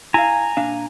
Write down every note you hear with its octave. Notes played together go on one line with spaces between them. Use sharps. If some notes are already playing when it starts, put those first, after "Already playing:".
E4 F5 G#5 A#5
A#2 D4 F5